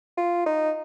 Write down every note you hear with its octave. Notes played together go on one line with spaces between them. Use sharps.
F4
D#4